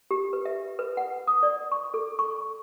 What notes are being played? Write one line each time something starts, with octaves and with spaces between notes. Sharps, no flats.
G4
B4
E5
B4
F#5
D#6
D5
C#6
A4
C#6